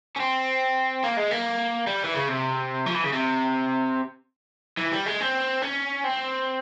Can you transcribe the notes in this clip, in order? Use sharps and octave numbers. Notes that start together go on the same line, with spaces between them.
C#4
C4
A#3
G#3
A#3
G3
E3
C#3
C3
F3
E3
C#3
C3
E3
G3
G#3
C4
C#4
C4